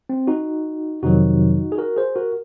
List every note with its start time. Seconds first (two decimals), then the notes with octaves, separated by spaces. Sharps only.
0.09 C4
0.27 D#4 F#4
1.03 F2 C3 D#3 F#3 D#4 F#4
1.72 G#4
1.78 F#4 A#4
1.97 G#4 C5
2.16 F#4 A#4